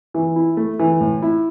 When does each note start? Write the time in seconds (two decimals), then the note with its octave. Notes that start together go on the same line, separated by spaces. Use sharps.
0.14 E3
0.36 E4
0.57 A3
0.79 E3
1.01 A2
1.22 E4